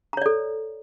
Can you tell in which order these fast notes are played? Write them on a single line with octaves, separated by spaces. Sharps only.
A#5 C#5 D5 A4